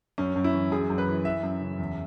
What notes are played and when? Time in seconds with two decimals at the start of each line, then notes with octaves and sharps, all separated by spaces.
0.18 F#2 C#4
0.36 F#2
0.44 E4
0.54 E3
0.72 F#2 G#4
0.90 F#2
0.98 B4
1.08 E3
1.25 E3 E5
1.43 F#2
1.61 C#3
1.79 E2